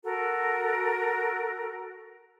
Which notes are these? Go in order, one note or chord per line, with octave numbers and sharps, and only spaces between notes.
F#4 A4 A#4 A#5